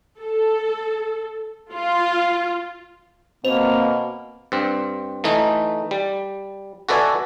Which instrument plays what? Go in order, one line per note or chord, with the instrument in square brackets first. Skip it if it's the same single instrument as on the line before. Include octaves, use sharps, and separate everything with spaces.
[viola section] A4
F4
[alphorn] B2 [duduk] A#3 [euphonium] C4 [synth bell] C5 F7
[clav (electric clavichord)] G2 C4
E3 A3 D#4
G3
F#4 A4 B4 D5 E5 G#5